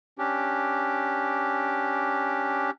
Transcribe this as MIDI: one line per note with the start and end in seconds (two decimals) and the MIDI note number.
0.18 2.71 61
0.18 2.71 62
0.18 2.71 67